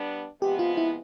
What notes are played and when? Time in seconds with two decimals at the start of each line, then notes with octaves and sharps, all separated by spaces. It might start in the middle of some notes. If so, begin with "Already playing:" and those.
Already playing: G3 B3 D4
0.41 C3 F3 G#3 B3 G4
0.59 F4
0.77 E4